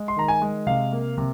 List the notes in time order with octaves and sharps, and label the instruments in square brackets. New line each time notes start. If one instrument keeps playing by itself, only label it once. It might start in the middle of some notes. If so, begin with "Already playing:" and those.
Already playing: [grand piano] G#3
C6
D#3 A#5
G#5
G#3
C3 F5
A#3
C3